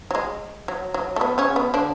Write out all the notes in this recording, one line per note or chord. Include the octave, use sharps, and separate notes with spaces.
F#3
G#3
F#3
F#3
A3
B3
C#3 C#4
B3
D3 D4